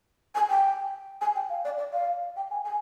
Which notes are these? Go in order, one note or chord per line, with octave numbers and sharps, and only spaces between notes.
G#5
G5
G#5
G5
F5
D5
D5
F5
G5
G#5
G#5